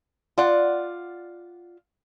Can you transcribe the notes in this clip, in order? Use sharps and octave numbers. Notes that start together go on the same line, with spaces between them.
F4 D5 F#5